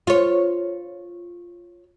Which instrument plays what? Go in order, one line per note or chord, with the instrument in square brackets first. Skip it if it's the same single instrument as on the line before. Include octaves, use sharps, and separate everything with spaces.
[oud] F4 C#5